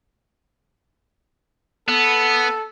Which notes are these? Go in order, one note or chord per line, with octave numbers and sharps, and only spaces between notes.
B3 A4